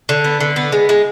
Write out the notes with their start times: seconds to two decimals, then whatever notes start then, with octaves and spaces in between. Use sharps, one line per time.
0.09 D3
0.24 B3
0.40 D3
0.56 B3
0.72 G#3
0.89 G#3